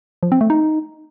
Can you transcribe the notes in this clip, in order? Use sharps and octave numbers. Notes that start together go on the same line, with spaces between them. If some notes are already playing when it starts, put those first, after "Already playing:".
F3
C4
A3
D#4